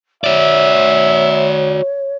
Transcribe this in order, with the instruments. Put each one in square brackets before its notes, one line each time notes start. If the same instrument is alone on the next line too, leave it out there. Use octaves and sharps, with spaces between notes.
[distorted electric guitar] F#4 D5 [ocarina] C#5 [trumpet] E5